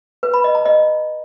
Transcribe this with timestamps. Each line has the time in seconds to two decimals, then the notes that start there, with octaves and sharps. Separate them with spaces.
0.23 B4
0.34 B5
0.44 D#5
0.55 A#5
0.65 D#5